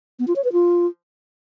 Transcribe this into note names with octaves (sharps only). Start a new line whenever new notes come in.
B3
F4
C#5
B4
F4